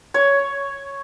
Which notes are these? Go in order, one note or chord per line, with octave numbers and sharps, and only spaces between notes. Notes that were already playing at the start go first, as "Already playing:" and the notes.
C#5